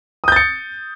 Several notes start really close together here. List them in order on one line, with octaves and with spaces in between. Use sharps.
D#6 G6 A6 C#7